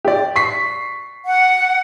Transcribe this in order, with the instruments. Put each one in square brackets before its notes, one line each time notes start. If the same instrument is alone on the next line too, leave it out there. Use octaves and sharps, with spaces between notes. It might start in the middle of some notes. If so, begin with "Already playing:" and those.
[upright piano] G4 D5
C#6 B6 C7
[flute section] F#5